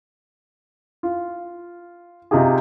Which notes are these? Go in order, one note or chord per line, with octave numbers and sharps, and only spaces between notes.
F4
C3 D#4 F4 G4 G#4